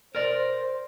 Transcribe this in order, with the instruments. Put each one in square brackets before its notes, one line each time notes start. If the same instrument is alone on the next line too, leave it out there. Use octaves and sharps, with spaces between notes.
[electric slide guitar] A#4 D5 [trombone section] C5